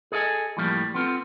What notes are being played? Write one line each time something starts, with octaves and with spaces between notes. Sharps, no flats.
G#4 A4 D#5 E5 G#5
A2 F3 G3 A#3
B3 C4 F4 A4